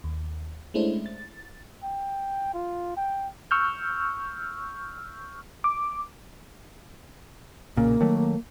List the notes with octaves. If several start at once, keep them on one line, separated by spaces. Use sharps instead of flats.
D#2
G#3 A3 C#4 D4 E4 C5
A6
G5
F4
G5
C#6 E6 F6 G6
D6
B1 A#2 C#3 A#3
D#3 F#3 A3